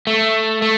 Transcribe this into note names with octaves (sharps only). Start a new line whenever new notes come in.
A3
A3